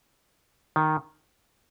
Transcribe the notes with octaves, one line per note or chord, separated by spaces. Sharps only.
D#3